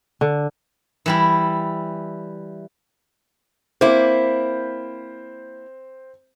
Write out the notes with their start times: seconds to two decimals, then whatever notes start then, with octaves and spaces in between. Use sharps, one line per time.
0.21 D3
1.06 E3 G3 E4
3.81 A#3 C4 E4 C5